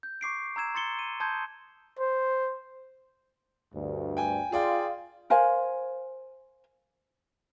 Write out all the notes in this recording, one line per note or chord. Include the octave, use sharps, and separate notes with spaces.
G6
C#6 D6 C7 D7
A#5 E6 G#6 E7
C6 A6 C#7 G7
D#7
A5 C6 D#6 G6 G#6
C5
D2 G2
G5 G#5
F4 G#4 D5 G5
A#4 C5 F5 G#5